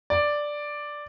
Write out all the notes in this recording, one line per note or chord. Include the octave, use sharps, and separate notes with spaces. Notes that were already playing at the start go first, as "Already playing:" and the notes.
D5